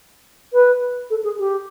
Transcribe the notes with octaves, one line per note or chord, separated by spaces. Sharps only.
B4
A4
G#4
G4